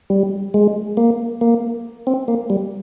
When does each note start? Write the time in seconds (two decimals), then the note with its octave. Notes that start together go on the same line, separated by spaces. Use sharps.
0.10 G3
0.54 G#3
0.97 A#3
1.41 A#3
2.07 C4
2.28 A#3
2.50 G3